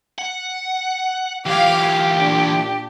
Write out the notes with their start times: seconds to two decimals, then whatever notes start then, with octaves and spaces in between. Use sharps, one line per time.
0.18 F#5
1.46 E3 F4 G4 F5 D6
2.16 A#2 D4